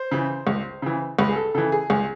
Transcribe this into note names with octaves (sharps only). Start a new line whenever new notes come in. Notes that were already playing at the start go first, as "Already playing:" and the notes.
Already playing: C5
C#3 E3
C#2
C#3 E3
C#2 B4
G#4
A4
C#3 E3 A4
G#4
C#2 G#4